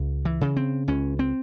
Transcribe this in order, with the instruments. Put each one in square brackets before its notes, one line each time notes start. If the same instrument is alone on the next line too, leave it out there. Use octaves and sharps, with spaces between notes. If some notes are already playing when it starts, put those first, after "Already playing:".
Already playing: [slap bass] C#2
E3
C#3
C4
C#2 C#4
C4